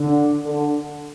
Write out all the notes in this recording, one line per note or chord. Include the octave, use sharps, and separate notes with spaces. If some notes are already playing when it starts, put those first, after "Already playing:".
Already playing: D3
D3